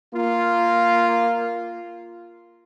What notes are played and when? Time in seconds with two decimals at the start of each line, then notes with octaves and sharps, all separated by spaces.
0.14 A#3 F4